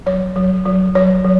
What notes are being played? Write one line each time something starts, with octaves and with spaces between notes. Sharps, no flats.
F#3 C#5
F#3
F#3
F#3 C#5
F#3